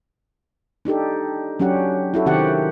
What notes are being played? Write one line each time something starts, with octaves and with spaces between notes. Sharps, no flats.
D4 D#4 G4 A4
F#3 C#4 D4 G4 F#5
E4 F#4 A4
C3 D#3 C4 F#4 G4 F#5